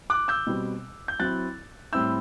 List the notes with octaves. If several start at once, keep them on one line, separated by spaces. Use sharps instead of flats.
D6 F#6
E6 G6
B2 G3 C4
G6
F#3 C4 E4 F#6 A6
A2 G3 C4 E4 E6 G6